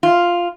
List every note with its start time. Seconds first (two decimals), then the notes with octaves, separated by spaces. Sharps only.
0.03 F4